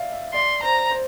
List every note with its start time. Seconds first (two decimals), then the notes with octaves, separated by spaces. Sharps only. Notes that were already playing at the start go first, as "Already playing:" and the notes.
Already playing: D5 E5 F5
0.12 E5
0.33 D5 C6
0.62 C5 A#5
0.90 C5